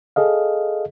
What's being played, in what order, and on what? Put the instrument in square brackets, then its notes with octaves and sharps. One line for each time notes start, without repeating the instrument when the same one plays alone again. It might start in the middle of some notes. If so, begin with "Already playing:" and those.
[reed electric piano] G#4 A4 D#5 F5